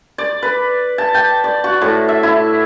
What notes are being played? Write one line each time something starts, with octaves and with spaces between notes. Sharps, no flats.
D5
B4
A5
G5
D5
F#4
A2
E5
E4